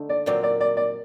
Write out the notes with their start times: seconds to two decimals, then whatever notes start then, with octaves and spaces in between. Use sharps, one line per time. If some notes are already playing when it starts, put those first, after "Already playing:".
Already playing: D3 A3 D#4
0.09 D5
0.26 A#2 F#3 C4 D5
0.43 D5
0.61 D5
0.77 D5